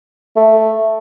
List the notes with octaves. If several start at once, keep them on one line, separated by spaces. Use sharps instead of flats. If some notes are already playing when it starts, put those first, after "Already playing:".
A3